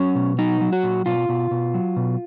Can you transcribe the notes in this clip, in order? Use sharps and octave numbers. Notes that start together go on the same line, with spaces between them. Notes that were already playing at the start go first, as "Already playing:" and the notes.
Already playing: F#3 C#4
B2
F#3 D#4
F#3
F#4
A#2
B2 F4
B2
B2
F#3
B2